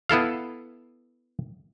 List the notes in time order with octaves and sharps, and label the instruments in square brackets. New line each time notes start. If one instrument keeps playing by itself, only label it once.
[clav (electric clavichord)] B3 E4 A4 F5